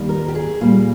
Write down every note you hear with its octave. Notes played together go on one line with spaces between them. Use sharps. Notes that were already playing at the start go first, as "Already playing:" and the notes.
Already playing: D#2 D#3 G3
A#4
G4
G#4
A#2 G3 A#3